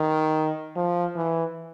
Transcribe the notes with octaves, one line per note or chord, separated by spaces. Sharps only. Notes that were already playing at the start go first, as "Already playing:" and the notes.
Already playing: D#3
F3
E3